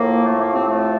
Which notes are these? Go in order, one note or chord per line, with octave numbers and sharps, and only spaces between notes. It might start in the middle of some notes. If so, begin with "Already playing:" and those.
Already playing: A2 F3 A#3
A3
A#3
C3 C4
A3